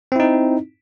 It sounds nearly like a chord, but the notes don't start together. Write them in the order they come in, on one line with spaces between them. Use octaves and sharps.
C4 E4 D#4